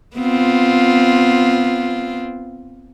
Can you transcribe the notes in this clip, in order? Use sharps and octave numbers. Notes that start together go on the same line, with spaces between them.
B3 C4 F4